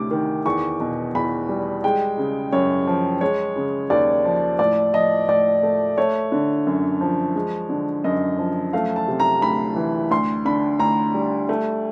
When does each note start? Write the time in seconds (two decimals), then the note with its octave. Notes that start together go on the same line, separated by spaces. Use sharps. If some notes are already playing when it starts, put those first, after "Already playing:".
Already playing: D2 C3 D6
0.11 D#3
0.45 E2 C#6
0.80 B2
1.14 E2 B5
1.49 G3
1.84 G#3 G5
2.18 C#3
2.52 F#2 C#5
2.87 F3
3.21 G#3 C#5
3.56 C#3
3.90 D#2 D5
4.25 F3
4.59 A2 D5
4.93 F3 D#5
5.28 A2 D5
5.63 A3
5.97 A3 C#5
6.32 D3
6.67 F#2
7.01 F3
7.35 G#3
7.69 D3
8.04 F#2 D#5
8.38 F3
8.73 A3 F5
8.96 A5
9.08 C3
9.20 A#5
9.42 D2 B5
9.76 E3
10.11 D2 C6
10.45 D3 B5
10.80 D2 A#5
11.14 G3
11.49 A3